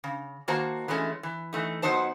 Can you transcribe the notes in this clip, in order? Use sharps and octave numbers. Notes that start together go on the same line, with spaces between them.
C#3
D#3 A#3 F#4 C5 A5
E3 G#3 A3 C#4
E3
E3 A3 D#4
F2 F#3 B3 D#4 C5 A5